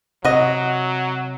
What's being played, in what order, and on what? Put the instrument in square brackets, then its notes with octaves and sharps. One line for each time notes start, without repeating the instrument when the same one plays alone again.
[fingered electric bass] C3 [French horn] F#3 [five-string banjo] F#4 D#5